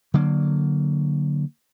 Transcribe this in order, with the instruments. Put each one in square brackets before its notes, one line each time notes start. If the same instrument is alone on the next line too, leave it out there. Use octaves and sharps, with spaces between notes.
[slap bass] D3 F#3 A#3